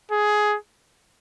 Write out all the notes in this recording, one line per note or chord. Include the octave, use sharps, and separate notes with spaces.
G#4